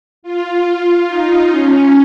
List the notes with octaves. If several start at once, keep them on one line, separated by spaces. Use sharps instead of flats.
F4
D#4
C#4